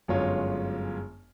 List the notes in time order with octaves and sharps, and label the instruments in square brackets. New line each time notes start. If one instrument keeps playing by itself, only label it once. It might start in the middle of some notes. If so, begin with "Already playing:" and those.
[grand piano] G1 F#2 G#3 F4 C#5